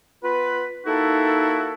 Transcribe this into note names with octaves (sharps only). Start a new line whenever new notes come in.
B3 F4 B4
A#3 D#4 E4 F#4 A4